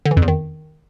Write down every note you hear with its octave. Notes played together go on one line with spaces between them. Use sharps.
D3
E3
F2
E2
D#3